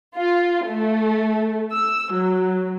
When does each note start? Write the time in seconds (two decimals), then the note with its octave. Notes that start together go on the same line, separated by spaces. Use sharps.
0.15 F4
0.66 A3
1.72 E6
2.13 F#3